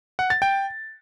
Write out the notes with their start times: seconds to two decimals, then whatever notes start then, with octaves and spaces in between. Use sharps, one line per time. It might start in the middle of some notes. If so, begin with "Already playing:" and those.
0.19 F#5
0.30 A6
0.42 G5